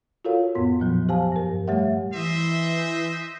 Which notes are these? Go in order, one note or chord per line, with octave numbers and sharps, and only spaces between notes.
F4 F#4 A4 A#4 C#5 F5
F2 A2 B3 C6
A#2 F3 F#3
G4 C5 F5 G#5 A5
G2 A#4
G3 A3 G4 C#5 E5 F#5
E3 C5 D#5 E5